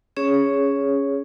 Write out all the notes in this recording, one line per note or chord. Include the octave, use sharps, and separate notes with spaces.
C#4 G#4 C#5